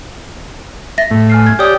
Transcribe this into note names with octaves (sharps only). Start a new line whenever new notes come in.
E5 A6 A#6
A2
G#5 F6 C7
G#6
G4 C#5 D5 D#6